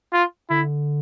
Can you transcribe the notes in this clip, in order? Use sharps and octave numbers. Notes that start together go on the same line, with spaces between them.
F4
D3 E4